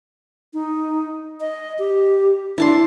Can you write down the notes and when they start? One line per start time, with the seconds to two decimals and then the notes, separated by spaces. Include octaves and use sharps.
0.53 D#4
1.40 D#5
1.79 G4
2.58 D4 E4 A5 C6